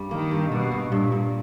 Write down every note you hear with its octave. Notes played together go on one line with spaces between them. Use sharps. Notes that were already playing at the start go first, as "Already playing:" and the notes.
Already playing: G2 G3
D#3 A#3
G2
B2 G3
G2
G2 A#2
G2